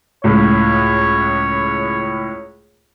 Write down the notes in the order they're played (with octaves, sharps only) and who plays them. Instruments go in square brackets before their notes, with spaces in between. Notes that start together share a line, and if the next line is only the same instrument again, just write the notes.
[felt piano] C#2 A2 [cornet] C#5